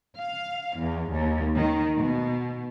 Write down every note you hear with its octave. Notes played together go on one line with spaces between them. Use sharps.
F5
E2
D#2
D#3
B2